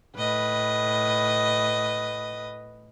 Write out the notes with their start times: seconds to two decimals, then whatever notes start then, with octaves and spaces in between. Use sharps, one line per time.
0.16 A2 B4 D#5